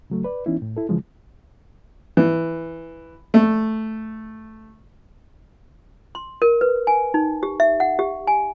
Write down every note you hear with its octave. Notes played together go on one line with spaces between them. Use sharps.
C#3 F#3 A3
B4 D5
E3 B3 C#4 D#4 E4
A2
E4 A4
C#3 E3 F3 G#3
E3
A3
C6
A#4
B4
G#5
D#4
G4
E5
F#5
G4
G#5